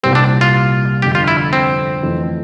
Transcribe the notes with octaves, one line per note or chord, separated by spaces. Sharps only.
C2 A#2 G3 C4
D4
F4
G1 F2 D3 G4
F4
E4
C4
F2 E3 A3 E4